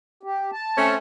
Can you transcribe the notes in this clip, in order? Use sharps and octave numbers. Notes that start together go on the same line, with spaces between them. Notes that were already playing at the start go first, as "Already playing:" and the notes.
G4
A5
A3 C4 C#4